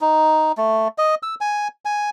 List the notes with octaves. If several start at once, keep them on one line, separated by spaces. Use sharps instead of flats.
D#4
A3
D#5
E6
G#5
G#5